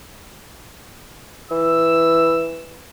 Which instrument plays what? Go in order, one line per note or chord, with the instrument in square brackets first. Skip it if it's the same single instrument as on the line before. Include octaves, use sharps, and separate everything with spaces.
[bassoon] E3 [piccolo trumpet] E6